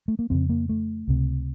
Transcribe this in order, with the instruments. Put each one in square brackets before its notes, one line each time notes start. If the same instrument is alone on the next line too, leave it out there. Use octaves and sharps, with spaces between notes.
[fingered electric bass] A3
A#3
F2 C#3 C4
A#3
A3
C#2 C3